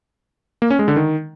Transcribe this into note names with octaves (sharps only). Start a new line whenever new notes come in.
A#3
C#4
G#3
D3
D#3